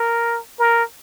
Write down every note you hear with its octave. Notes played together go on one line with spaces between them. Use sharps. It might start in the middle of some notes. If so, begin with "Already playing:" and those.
Already playing: A#4
A#4